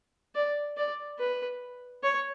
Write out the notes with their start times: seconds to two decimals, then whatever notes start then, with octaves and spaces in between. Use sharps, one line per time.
0.35 D5
0.77 D5
1.19 B4
2.03 C#5